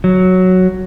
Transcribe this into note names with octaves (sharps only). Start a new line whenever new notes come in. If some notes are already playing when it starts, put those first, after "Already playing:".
F#3